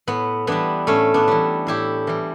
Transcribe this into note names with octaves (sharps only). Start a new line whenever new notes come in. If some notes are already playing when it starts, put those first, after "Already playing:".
A2 B3
E3 G3 B3 D4
A2 A3 C#4
B3 D4
E3 G3
A2 E4 G4
E3 G3